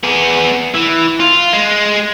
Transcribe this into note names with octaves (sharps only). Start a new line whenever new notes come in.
B3 G#4
E3
F4
G#3